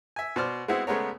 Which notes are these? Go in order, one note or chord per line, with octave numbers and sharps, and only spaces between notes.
E5 G#5
B2 C5 D5 F6
G#3 B3 C4 E4 F#4
C#3 G#3 A3 B3 A#4 C#5